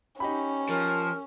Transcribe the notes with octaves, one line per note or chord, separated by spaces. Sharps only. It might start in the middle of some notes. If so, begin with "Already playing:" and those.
C#4 D#4 G4 B5
F3 A#4